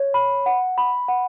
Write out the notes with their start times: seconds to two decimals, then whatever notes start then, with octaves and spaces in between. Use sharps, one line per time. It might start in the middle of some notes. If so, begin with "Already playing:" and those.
Already playing: C#5
0.14 B5
0.46 F#5
0.78 B5
1.08 F#5